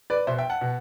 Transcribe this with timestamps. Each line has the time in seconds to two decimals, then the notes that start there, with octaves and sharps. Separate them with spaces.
0.10 B4 D5
0.27 B2 C5 E5
0.38 E5 G5
0.50 F#5 A5
0.61 B2